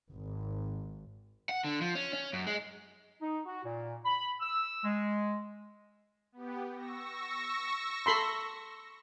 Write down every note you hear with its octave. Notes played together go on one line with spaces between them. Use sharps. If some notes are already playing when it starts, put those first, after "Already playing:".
G#1
F#5
D3
F3
C#4
C#4
F#2
G#3
D#4
F#4
A#2
B5
E6
G#3
B3 G4
C#6 E6 A#6
A4 B5 C6